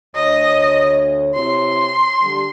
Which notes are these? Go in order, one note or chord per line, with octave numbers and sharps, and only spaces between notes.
D2 C#5 D#5
C3 E4 C#5 C6
D3 G3